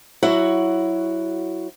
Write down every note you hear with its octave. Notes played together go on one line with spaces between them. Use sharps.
F#3 E4 F#4 C#5 F#5